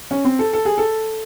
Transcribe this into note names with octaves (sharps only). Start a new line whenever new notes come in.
C#4
C4
A4
A4
G#4
A4